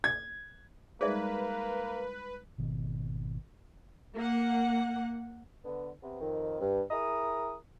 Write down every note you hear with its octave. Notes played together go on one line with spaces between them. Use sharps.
G#6
G3 G#3 A#3 D#4 G#4 B4 D5 E5
G#1 B2 D#3
A#3 F#5
D3 B3
C3 B3
F2 D#3
G2
E4 G#4 A#4 A#5 D#6